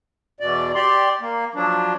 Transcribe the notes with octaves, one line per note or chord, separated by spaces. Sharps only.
E2 B2 D5
G4 D5 C6
A#3
F3 F#3 D4